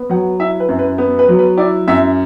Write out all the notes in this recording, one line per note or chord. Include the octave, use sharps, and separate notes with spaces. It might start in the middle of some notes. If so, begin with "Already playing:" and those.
Already playing: B3
F#3 F#5
E4 E5
B4
F#2
B4
B3
B4
F#3
B4
E4 D5
F#2 E5